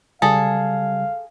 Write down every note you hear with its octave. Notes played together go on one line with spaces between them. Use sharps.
C#3 G3 G#4 A4 F5